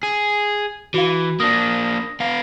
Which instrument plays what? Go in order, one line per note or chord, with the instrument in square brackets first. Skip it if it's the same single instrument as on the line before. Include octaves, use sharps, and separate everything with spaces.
[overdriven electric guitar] G#4
[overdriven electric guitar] E3 [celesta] F#4 F5
[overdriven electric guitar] A#3 D4 [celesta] D#6 A#6
[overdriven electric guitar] B3 F5